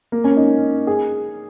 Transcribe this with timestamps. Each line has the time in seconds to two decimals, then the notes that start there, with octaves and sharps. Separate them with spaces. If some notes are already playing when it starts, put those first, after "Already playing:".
0.12 A#3
0.24 C#4
0.37 D#4
0.87 G#4